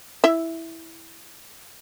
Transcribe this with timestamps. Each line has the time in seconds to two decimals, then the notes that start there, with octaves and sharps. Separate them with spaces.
0.24 E4 E5